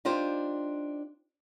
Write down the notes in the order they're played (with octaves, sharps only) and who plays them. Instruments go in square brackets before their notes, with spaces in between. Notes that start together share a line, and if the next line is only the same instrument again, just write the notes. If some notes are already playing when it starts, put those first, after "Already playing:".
[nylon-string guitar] D4 D#4 F4 G4 C5